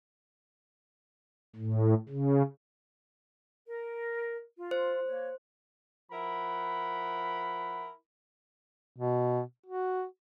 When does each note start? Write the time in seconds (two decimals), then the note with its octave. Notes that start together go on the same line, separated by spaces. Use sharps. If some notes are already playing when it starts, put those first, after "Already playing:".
1.56 A2
2.09 C#3
3.68 A#4
4.58 F4
4.71 C5
5.08 A#3 C#5
6.12 F3 E4 A#4 F#5 B5
8.97 B2
9.66 F#4